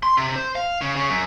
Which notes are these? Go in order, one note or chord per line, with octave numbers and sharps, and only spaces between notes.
C6
C3
C5
F5
C#3
C#3
F#2